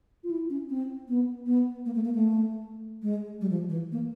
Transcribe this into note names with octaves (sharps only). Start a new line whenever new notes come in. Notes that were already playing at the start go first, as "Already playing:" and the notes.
F4
E4
C#4
C4
B3
B3
A#3
A3
A#3
A3
G#3
G3
F3
E3
A#3